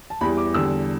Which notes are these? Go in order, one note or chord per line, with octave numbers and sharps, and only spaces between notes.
A5
E2 E3 G3 B5
D6
E2 D3 G3 E6